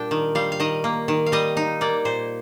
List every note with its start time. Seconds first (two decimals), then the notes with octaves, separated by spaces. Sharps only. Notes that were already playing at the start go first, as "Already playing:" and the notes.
Already playing: A#2 G3 D4 G5
0.11 D#3
0.35 G3 F5
0.52 F5
0.60 D#3 D#5
0.84 A#3
1.08 D#3
1.26 F5
1.32 G3 D#5
1.57 D#4
1.81 A#3 D5
2.05 A#2 C5